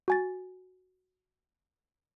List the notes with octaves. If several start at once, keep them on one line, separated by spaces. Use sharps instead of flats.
F#4 G#5 A6